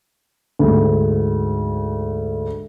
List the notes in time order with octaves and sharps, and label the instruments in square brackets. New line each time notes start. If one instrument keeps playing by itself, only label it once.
[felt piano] D2 G#2